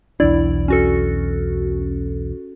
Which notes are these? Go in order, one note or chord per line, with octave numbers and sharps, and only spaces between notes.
B1 E2 D4 E4 D5
C#4 F#4 A4